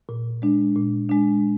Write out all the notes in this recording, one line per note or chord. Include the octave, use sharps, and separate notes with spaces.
A#2
G#3 D4
A#2
G#3 D4